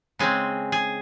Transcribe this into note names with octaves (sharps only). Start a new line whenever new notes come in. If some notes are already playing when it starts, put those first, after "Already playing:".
C#3 G#3 C4 G#4
G#4